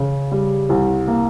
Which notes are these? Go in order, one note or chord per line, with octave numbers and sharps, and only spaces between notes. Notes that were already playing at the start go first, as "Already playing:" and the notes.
Already playing: C#3
G3
C2
A#3